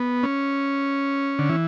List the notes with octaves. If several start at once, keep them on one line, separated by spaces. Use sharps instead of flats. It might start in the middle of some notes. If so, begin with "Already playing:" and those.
Already playing: B3
C#4
D3
E3